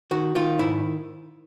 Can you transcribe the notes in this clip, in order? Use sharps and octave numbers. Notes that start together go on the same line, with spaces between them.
D#3 F#4
D#3 F4
G#2 E4